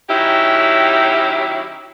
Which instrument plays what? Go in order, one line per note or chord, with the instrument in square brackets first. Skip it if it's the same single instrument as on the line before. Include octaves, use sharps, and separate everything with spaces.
[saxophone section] D#3 F#3 C#4 E4 G4